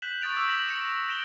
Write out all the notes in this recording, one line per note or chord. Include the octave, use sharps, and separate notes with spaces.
F#6 G6 B6 E7 F#7
C#6 D#6 A6 D7 F7
C#6 D6 E6 G6
A#6 B6 E7 F#7
A#6 C#7 D7 E7 F#7
A#6 D7 E7 F7 G7